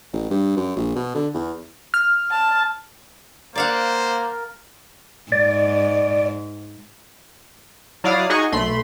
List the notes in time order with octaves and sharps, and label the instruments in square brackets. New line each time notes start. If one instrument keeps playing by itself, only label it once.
[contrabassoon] A1
G2
F#2
A#1
B2
D3
E2
[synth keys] F6
[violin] A5
[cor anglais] A#3 [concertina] A#4 [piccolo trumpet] C5 [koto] D5 F5 F#5
[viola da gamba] G#2 [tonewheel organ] D5
[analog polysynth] F#3 E4 D5 F5 D#6 F6
D#4 F#4 G#4 D#5 G#5 C#6
B1 A3 B5 C6